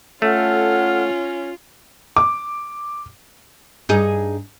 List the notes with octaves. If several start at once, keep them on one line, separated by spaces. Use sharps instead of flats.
A3 C#4 F4 A4 F#5 F6
D6
G2 D#4 G#4